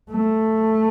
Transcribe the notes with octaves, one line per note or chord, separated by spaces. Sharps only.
A3